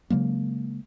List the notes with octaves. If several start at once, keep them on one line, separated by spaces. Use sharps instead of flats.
C#3 F#3 G#3 A#3